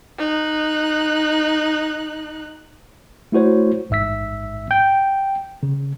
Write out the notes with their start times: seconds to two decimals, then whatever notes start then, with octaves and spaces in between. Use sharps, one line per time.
0.19 D#4 F#6
3.32 A3 E4 F#4 C5 C#5
3.90 A1 G#2 E5 E6 B6
4.71 G5 G6
5.63 C#3